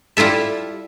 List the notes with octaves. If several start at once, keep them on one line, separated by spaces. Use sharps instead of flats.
G3 E4 F4 A4 E5